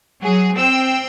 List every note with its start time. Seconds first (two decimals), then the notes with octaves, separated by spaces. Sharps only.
0.22 F#3 G#4
0.55 C4 G5 E6